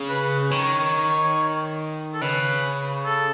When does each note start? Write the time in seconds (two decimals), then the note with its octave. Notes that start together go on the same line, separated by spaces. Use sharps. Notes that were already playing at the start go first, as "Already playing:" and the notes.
Already playing: C#3
0.09 B4
0.51 D#3 C#5
2.14 A4
2.21 C#3 B4
3.06 A4